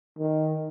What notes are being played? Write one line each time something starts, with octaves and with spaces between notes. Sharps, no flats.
D#3